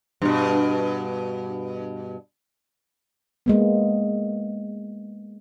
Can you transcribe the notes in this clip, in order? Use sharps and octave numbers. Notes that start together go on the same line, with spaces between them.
G2 B2
G#3 A#3 B3